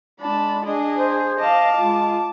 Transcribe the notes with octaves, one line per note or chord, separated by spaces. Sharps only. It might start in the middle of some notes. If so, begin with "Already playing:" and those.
G#3 D4 A5 B5
D4 G#4 D#5
C5
D#5 F5 A5 D6
G#3 F4